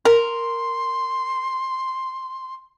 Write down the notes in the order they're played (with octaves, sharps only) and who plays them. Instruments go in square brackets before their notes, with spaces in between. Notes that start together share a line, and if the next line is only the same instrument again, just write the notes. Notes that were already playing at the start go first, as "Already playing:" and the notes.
[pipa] A#4 [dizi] C6